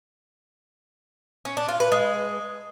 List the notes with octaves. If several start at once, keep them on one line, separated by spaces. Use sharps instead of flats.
C#4
D4
F4
B4
G#3